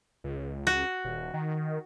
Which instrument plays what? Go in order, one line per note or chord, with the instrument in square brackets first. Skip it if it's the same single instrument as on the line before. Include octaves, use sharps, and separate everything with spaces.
[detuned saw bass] C#2
[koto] F#4
[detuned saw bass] D#1
D#3